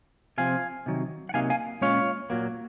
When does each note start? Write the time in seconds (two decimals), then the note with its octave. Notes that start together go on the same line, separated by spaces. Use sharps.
0.38 C3 F3 C4 F5 G#5
0.86 C3 D#3 F#3
1.29 F#5
1.34 C3 F#3 A#3 D#4 F5 G#5
1.50 F5 G#5
1.81 A#2 G#3 C#4 F4 C#5 F5
2.30 A#2 F#3 A#3